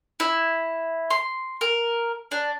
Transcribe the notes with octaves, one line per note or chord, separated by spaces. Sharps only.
E4
C6
A#4
D4